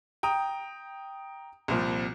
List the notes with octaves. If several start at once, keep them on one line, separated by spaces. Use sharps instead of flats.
G5 A#5 D#6
C2 A#2 F3